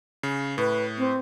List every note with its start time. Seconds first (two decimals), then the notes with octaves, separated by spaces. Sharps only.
0.23 C#3
0.58 A2 B4
0.98 C4